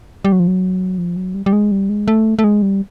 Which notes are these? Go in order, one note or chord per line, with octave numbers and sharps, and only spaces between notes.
G3
F#3
F3
F#3
F3
F#3
G3
G3
G#3
G3
G#3
A3
A3
G#3
G3